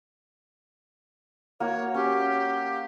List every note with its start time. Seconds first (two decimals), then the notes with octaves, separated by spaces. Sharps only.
1.60 A#3 F#4 C#5
1.94 C#4 G4